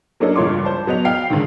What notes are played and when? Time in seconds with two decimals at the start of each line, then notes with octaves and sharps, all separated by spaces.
0.20 F#3 A#3 C#4 D4 A4 D#5
0.36 C#2 G2 F4 C#5 C6 D6
0.65 C5 A5
0.87 F#3 B3 D#5 F7
1.05 F5 G5 C7
1.30 G#2 D3 D#3